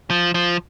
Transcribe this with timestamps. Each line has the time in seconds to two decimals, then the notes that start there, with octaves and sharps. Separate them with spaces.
0.10 F3
0.34 F3